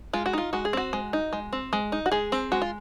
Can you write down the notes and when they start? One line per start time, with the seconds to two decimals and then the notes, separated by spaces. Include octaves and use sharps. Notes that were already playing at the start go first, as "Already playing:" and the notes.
0.13 G#3 F4
0.26 F#4
0.33 D#4 F4
0.53 G#3 F#4
0.65 G#4
0.73 C4 F#4
0.93 G#3
1.13 D#4
1.33 G#3
1.53 C4
1.73 G#3
1.92 D#4
2.06 F#4
2.12 G#3 G#4
2.32 C4
2.52 G#3 F#4
2.62 F4